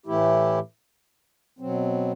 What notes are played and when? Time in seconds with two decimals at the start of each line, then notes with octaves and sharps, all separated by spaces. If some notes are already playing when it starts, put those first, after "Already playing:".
0.06 A2 E3 A3 E4 G4
1.59 B2 F#3 C4